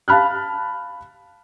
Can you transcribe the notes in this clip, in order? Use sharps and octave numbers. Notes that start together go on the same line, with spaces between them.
F5 A5 B5 F6 F#6